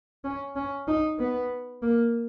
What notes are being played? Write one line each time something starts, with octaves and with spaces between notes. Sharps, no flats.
C#4
C#4
D#4
B3
A#3